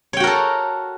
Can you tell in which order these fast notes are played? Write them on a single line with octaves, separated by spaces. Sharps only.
C#5 G5 F#4 A#4 A4